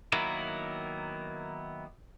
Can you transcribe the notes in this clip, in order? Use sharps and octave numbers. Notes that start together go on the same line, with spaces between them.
D#3 F#3 A#3 B3 E4 A#4